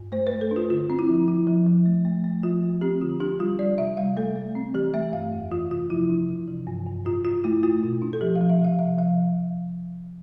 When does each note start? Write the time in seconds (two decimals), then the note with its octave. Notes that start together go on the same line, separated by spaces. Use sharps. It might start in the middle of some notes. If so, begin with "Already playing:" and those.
Already playing: G2
0.12 A3 C5
0.27 B4
0.32 A3
0.41 A4
0.51 D4
0.56 F4
0.70 D3 F4
0.90 C4
0.99 E4
1.09 F3
1.28 E4
1.47 F3
1.67 F3
1.86 A3
2.05 A3
2.24 A3
2.43 F3 F4
2.63 A3
2.81 C4 G4
3.01 D3 F4
3.20 D4 G4
3.39 G3 F4
3.59 G3 D5
3.78 C3 E5
3.97 G3 F5
4.17 A3 A4
4.36 A3
4.55 C4
4.74 E3 G4
4.94 A3 E5
5.13 G2 F5
5.33 F2
5.51 E3 F4
5.71 C3 F4
5.90 F3 E4
6.09 D4
6.29 C3
6.48 E3
6.67 G2
6.86 G2
7.05 A2 F4
7.25 A2 F4
7.44 A3 E4
7.63 A3 F4
7.83 B2
8.02 D4
8.13 A4
8.21 F3 G4
8.35 F5
8.41 F3
8.50 E5
8.59 C3
8.64 F5
8.79 F3 E5
8.98 F3 F5